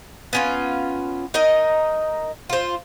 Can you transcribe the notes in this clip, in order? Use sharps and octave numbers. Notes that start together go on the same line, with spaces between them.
B3 C#4 F4
D#4 A#4 D#5
F4 C5